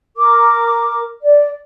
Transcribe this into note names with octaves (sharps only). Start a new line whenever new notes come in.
A#4 D6
D5